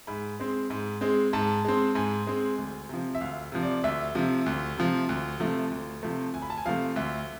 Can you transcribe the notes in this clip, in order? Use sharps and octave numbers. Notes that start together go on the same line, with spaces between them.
G#2 B5
G#3 C4
G#2
G#3 C4
G#2 A5
G#3 C4
G#2 G#5
G#3 C4
D2
C3 F3
E5
D2 F5
C3 F3
D5
D2 E5
C3 F3
D2
C3 F3
D2
C3 F3 A3
D2
C3 F3 A3
D2 G#5
B5
A5
G#5
C3 F3 A3 F5
D2 E5